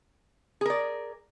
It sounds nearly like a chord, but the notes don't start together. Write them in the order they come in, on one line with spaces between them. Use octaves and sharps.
G#4 A#4 D5